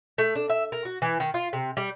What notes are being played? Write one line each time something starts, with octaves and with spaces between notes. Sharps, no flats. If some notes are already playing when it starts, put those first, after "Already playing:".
A3
D4
E5
A#4
F#4
E3
D#3
F4
C3
G3